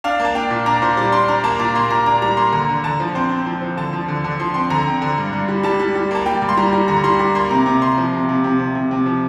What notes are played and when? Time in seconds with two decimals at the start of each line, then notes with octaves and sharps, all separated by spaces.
0.04 D4 F5
0.20 A#3
0.25 A5
0.35 D4 G5
0.50 A#2
0.66 D4 A#5
0.82 A#2 C5
0.97 G3 D5
1.12 D4 C6
1.28 D4 A#5
1.44 A#3 A5
1.59 A#2 A#5
1.75 A#3 C6
1.90 A#2 A#5
2.06 D4 A#5
2.22 G3 A#5
2.37 A#3 C6
2.53 D3 A#5
2.69 D3
2.84 D3 A5
3.00 F3
3.15 C4 C5
3.30 C4
3.46 F3
3.62 F3
3.77 D3 A5
3.93 F3
4.08 D3
4.24 D3
4.40 F3 C6
4.54 C4 C6
4.70 D3 A#5
4.87 C4
5.02 D3
5.18 G2
5.33 G2
5.48 G3
5.63 G3 A5
5.80 G3
5.96 G3
6.11 A#3 A5
6.26 G3 G5
6.42 G2
6.49 C6
6.57 G3 A#5
6.73 G3
6.88 D3 A#5
7.04 G3 C6
7.19 G3 C6
7.35 A#3 C6
7.51 C3 A#5
7.66 C3
7.82 C3 C6
7.97 F3
8.13 C3
8.29 C3
8.44 C3
8.60 C3
8.75 C3
8.91 C3
9.06 F3